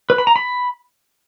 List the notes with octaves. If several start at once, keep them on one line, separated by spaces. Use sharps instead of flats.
B4
B5
A#5
B5